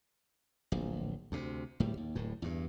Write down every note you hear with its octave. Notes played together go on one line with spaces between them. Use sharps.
D1 A#1
D2 C3
D1 A2 G3
D#2
D1 A2
E2 G2